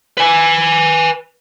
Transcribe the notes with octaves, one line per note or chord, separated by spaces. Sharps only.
B4 G#5